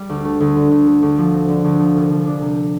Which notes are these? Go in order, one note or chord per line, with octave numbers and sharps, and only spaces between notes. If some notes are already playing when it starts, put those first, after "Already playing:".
Already playing: G3
D2
A3
D2
D3
D2
A3
D2
F3
C4
D3
D2
F3
C2
F3
D4
C3